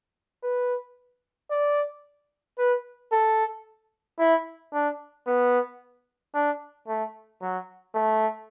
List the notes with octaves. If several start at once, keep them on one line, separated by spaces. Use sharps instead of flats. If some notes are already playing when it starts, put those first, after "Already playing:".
B4
D5
B4
A4
E4
D4
B3
D4
A3
F#3
A3